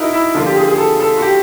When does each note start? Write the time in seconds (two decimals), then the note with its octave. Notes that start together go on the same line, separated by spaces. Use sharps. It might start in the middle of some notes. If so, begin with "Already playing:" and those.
Already playing: D#4 E4 F#4 A#4
0.13 E4
0.35 D3 F3 A#3 F4
0.46 G4
0.56 G#4
0.68 G#4
0.78 A4
1.00 A4
1.17 F#4
1.22 G4